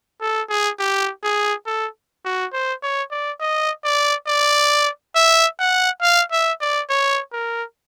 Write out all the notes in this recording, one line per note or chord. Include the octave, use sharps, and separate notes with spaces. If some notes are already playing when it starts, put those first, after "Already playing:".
A4
G#4
G4
G#4
A4
F#4
C5
C#5
D5
D#5
D5
D5
E5
F#5
F5
E5
D5
C#5
A#4